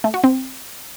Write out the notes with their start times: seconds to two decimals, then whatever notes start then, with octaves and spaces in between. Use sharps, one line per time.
0.04 A3
0.14 F#4
0.24 C4